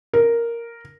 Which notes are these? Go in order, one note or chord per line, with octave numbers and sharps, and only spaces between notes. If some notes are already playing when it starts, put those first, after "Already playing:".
A#4